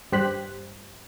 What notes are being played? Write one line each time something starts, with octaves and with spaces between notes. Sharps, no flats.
G2 G4 C5 F#6 B6